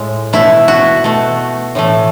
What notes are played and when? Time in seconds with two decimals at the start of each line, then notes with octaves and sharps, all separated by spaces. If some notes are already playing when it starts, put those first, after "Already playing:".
Already playing: A2 G#3
0.33 B2 A3 E4
0.68 F#4
1.04 B2 A3
1.75 A2 E3 A3